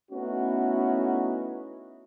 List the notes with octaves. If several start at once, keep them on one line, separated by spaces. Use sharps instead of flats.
A3 B3 C#4 D#4 E4 F#4